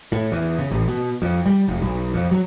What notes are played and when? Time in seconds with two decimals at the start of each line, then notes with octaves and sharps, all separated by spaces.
0.12 A2
0.32 E2
0.59 C#3
0.71 A1
0.88 B2
1.22 F2
1.46 G3
1.68 F1
1.82 B1
2.14 F2
2.31 F#3